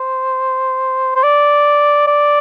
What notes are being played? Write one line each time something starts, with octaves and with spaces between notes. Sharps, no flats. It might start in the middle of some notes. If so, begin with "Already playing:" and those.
Already playing: C5
C5
D5
D5